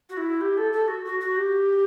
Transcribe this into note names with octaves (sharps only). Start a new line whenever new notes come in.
F#4
E4
G4
A4
A4
F#4
F#4
F#4
G4